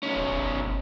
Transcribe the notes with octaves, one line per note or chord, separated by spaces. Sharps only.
B1 C#4
D1
G1